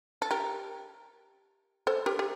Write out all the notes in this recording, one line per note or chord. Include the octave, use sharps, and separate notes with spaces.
A4
G4 A#4
A4 C5
G4 A#4
G4